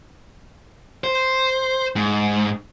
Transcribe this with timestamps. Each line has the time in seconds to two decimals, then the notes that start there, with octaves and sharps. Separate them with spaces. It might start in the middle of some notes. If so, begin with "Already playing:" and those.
1.04 C5
1.96 G#2